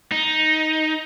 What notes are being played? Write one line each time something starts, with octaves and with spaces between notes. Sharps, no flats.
D#4